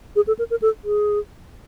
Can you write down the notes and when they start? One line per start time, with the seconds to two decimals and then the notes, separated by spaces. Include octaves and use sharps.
0.16 G#4
0.27 A4
0.39 A#4
0.50 A#4
0.62 A4
0.84 G#4